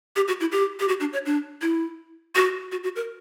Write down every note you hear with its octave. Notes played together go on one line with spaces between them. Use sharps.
G4
F#4
E4
G4
G4
F#4
D4
C#5
D4
E4
F#4
F#4
F#4
A#4